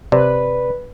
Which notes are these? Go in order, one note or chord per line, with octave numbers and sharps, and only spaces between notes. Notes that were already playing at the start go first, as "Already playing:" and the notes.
C3 B4 D5